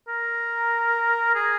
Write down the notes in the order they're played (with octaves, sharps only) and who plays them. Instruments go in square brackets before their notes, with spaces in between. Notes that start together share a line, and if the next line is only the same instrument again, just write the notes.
[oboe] A#4
G#4